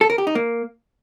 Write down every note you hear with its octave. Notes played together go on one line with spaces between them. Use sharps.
A4
A#4
G4
D#4
A#3